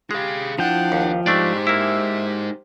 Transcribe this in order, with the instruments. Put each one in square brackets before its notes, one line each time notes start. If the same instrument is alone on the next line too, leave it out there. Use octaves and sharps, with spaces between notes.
[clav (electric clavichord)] G#3 [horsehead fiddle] G4 [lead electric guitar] G#4 F5
[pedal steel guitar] F3 G5 [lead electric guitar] D4 [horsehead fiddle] E4 F#5
[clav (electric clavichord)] D#2
[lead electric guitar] G#3 D#4 [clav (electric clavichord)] A3 D4 D5 [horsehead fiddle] G4 C5
[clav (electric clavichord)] A#3 E4 [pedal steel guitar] E5